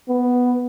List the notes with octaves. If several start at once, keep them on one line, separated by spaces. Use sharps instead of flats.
B3